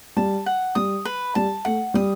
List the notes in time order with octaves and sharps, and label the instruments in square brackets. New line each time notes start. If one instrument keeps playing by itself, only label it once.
[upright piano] G3 [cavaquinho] A5
[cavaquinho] F#5
[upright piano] G3 [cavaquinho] D#6
[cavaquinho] B4
[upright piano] G3 [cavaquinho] A5
[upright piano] A3 [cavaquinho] F#5
[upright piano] G3 [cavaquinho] D#6